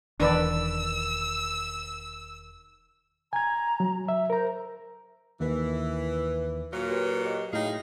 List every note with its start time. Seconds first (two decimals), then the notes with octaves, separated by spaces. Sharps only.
0.20 E1 D#3 E3 D4 B4 D5 E6
3.33 G#5 A#5 G#6
3.80 F#3
4.08 E5
4.30 A#4 C5 A#5
5.40 D#2 D#3 E3 B4
6.73 A#2 F#3
6.90 G4 B4
7.25 G4 D#5
7.53 A2 D#4 G#4 D#5 F5 G5